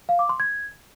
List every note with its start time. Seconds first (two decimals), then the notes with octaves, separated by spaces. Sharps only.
0.09 F5
0.19 D6
0.29 C6
0.40 G#6